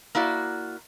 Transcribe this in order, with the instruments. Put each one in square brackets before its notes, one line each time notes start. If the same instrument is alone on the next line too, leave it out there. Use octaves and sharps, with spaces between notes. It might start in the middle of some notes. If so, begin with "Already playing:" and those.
[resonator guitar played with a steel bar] A#3 E4 F#4 D5